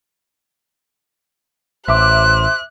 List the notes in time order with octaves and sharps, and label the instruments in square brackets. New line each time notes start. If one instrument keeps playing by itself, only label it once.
[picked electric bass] A1 [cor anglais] C5 [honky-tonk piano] E5 D6 [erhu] F#6